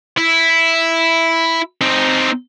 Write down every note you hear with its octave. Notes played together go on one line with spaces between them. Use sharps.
E4
C4 D#4